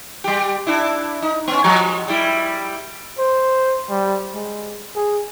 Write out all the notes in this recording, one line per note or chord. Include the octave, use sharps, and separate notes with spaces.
G3 G4
D4 E4
D#4
B3 C#4
F3 F#3 G#3
G3 E4
C5
G3
G#3
G#4